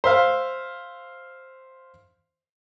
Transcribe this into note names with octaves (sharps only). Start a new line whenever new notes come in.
C5 E5 F5